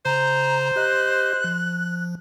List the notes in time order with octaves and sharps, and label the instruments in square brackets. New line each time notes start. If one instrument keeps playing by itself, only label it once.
[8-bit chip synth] C#3 [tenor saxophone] C5 [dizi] A#5
[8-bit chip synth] G4 D#5 [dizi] F#6
[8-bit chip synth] F3